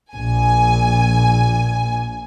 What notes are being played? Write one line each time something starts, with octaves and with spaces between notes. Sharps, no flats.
A#1 G#5